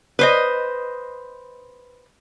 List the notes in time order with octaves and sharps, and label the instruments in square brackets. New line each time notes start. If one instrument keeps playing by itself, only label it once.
[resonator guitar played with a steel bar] B4 C5 D#5